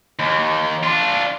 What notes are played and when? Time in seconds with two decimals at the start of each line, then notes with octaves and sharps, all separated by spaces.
0.19 D#2
0.83 D4 F4